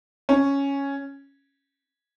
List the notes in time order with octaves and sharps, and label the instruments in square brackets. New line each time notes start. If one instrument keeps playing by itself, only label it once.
[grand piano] C#4